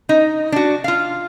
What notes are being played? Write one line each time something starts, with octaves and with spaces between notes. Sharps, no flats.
D#4
D4 F#4
F4 F5